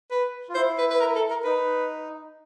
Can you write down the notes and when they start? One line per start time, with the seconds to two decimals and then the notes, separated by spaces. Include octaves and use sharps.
0.11 B4
0.49 F4
0.55 E4 C5
0.78 B4
0.91 B4
1.00 A#4
1.16 A4
1.30 A#4
1.44 D#4 B4